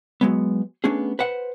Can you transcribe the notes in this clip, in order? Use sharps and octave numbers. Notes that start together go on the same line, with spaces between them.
F#3 G#3 B3
A3 B3 C#4 D4 G#4
B4 C5 F#5